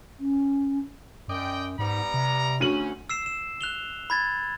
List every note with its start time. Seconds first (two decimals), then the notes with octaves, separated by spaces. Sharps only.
0.19 C#4
1.28 F#2 D5 D#5 G5
1.79 G#2 G3 B3 A#5
2.14 C3
2.60 D2 C#4 D#7 F#7
3.10 E6 C7 E7
3.26 E7
3.61 F#6 F7 G7
4.10 B5 G#6 A6